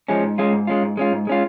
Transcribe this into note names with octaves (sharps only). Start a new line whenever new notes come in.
F3 G#3 C#4
G#2
G#3 C#4 F4
G#2
G#3 C#4 F4
G#2
G#3 C#4 F4
G#2
G#3 C#4 F4